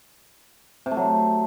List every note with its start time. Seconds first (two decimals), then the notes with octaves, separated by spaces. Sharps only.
0.86 C3
0.91 A3
0.97 F#3